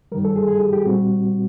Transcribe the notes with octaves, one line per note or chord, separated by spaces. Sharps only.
G2 D#3 G3 A#4
A4
G#4
G#4
G4
G4
A#2 G3 C4 F#4